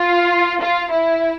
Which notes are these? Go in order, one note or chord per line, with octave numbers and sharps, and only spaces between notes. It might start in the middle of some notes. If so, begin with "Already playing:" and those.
Already playing: F4
F4
E4